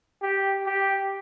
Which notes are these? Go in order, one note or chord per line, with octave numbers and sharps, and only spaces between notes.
G4
G4